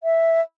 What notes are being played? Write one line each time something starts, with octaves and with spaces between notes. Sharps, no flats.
E5